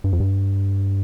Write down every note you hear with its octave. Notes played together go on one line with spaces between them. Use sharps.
G2
F2
G2